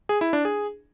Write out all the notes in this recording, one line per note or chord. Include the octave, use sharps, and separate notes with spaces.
G#4
E4
D4
G#4